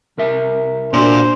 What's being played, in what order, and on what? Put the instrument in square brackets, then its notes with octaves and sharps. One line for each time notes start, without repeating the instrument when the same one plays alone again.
[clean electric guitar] C2 A#4 E5
[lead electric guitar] A#2 [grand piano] D4 F#4 [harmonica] C5